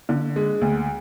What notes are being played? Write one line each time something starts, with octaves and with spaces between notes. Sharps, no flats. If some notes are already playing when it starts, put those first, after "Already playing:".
D3
G#3
D2